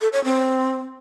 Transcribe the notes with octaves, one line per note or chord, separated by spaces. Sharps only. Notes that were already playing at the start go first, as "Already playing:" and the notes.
A4
C#5
C4